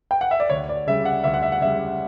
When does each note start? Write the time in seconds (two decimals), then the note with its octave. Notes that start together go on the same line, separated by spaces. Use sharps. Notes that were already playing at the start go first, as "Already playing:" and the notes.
0.11 G5
0.21 F#5
0.31 E5
0.40 D5
0.50 D2 C#5
0.69 D5
0.87 C#3 G3 E5
1.05 F#5
1.24 D2 E5
1.34 F#5
1.42 E5
1.52 F#5
1.61 C#3 G3 E5